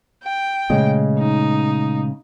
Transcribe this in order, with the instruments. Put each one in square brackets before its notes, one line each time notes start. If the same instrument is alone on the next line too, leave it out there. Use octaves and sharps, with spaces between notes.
[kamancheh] G5
[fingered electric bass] A#2 G#3 A3 [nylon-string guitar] C#3 G#4 D#5
[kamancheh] D#4